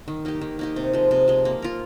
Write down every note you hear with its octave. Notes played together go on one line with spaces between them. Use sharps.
D#3
A#3 D#4 G4
D#3
A#3 D#4 G4
C3
F3 G#3
C3
F3 G#3
A#3
F4 A#4